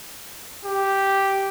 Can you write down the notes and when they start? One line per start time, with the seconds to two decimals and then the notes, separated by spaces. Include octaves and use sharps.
0.65 G4